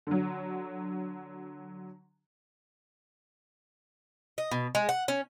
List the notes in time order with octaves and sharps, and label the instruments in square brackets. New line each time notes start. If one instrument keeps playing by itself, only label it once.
[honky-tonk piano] D3 F#3
[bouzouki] D#5
B2
G#3
F#5
C#4